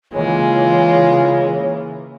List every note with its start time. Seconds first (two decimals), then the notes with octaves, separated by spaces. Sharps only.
0.14 C#3 E3 G#3 A#3 F4 C#5